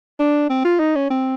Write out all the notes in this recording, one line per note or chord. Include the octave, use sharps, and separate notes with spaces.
D4
C4
F4
D#4
C#4
C4